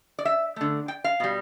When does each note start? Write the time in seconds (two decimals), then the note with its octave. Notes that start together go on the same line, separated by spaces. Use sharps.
0.19 D5
0.25 E5
0.56 D3 A3
0.88 G5
1.04 F5
1.20 B2 G3